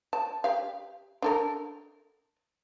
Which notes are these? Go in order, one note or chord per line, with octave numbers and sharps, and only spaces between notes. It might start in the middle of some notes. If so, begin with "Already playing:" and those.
A5
G4 F5
D4 A4 A#4